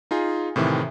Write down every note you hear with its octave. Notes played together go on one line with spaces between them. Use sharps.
D#4 F4 G#4
A2 C3 D#3 E3